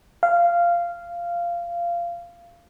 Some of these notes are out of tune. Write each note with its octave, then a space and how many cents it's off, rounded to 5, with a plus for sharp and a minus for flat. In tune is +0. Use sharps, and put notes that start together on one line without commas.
F5 -15